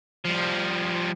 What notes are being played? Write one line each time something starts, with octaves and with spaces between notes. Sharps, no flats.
F3 G3